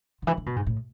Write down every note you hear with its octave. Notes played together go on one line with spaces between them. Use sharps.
D3
E3
D3
B2
G#2
A2